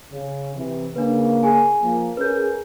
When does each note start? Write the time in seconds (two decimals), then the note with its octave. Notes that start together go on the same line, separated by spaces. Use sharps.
0.12 C#3
0.56 C3 E3
0.96 C#3 A#3 D4 B4
1.43 G#4 G#5
1.82 F3 A#3
2.17 C#4 G#4 A#4 B4 G6